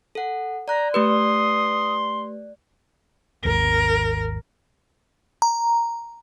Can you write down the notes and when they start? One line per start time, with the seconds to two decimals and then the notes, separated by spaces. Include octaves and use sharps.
0.15 A4 F#5
0.68 D5 A#5 F#6
0.94 A3 G4 B4 C6 D#6
3.45 G#1 D#2 A#4
5.42 A#5